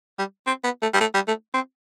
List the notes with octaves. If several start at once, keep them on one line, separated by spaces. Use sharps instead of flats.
G3
C4
B3
A3
G3
A3
G3
A3
C4